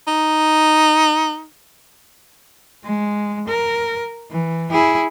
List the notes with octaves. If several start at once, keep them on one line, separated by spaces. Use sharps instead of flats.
D#4
G#3
A#4
E3
E4 G#4